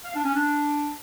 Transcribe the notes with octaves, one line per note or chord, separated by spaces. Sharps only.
F5
D4
C#4
D4